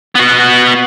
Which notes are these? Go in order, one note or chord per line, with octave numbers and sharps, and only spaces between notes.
B3 F#4